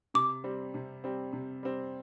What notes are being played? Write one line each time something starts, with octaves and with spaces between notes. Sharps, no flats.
C3 D6
G3 C4
C3
G3 C4
C3
G3 C4